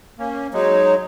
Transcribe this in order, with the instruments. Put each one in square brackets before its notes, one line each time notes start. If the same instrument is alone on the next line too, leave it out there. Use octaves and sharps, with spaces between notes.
[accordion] A#3 C#4
[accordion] F#3 G#3 D#4 [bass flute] C#5